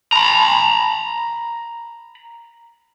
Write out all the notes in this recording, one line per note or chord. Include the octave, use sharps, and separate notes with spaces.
A#5 B5